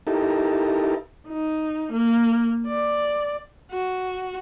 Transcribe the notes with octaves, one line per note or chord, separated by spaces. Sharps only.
D#4 E4 G4 A4 A#4
D#4
A#3
D5
F#4